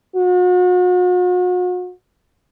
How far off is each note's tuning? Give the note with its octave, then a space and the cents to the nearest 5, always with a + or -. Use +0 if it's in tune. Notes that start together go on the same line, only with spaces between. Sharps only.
F#4 -40